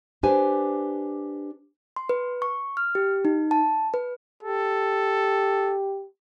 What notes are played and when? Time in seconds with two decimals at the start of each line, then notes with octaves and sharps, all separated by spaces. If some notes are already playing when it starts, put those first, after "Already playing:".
0.23 D4 G4 B4 C5 G#5
1.96 C6
2.09 B4
2.42 C#6
2.77 F6
2.95 G4
3.25 D#4
3.51 A5
3.94 B4
4.43 G4 A4